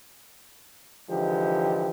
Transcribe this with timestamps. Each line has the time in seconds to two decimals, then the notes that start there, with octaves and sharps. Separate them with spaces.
1.09 D3 E3 F3 G#3 D#4 G4